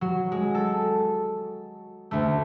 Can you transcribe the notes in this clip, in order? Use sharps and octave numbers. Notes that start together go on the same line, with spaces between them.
F#3
G#3
A4
D2 A3